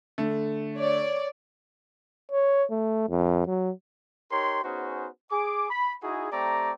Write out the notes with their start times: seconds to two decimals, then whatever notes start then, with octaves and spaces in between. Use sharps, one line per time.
0.18 D3 A3
0.75 C#5 D5
2.31 C#5
2.71 A3
3.09 F2
3.47 F#3
4.32 D#4 G4 A#4 C#5 C6
4.64 B3 C#4 D#4 F#4 G#4 C5
5.32 G#4 D6
5.71 B5
6.03 D#4 E4 F#4 G#4
6.32 A3 C4 G4 D5 A#5